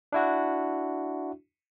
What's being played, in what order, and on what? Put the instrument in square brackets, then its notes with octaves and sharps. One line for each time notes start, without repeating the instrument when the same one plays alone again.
[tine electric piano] D4 E4 F#4